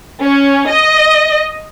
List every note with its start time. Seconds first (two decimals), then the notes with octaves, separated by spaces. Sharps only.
0.23 C#4
0.69 D#5